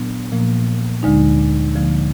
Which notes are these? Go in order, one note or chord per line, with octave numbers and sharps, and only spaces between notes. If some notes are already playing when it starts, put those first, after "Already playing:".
Already playing: A#2 F#3 B3 D4
A#2 F3 A#3
D2 D3 G#3 D#4
D2 D3 F3 A#3